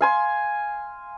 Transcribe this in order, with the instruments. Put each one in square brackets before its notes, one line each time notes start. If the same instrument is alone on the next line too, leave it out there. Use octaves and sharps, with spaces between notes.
[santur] F5 G#5 C6